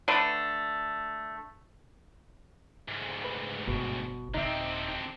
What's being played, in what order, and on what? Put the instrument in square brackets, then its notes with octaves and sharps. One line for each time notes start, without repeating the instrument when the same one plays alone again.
[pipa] D3 A3 B4
[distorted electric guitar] D2 G#2
[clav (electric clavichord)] B4
[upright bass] G1 [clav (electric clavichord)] B2
[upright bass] D#1 E4 [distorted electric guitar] D3 C4 [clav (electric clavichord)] D#4 E5